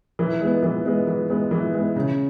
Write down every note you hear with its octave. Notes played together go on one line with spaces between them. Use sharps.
E3
G#3 B3
E3
G#3 B3
E3
G#3 B3
E3
G#3 B3
C#3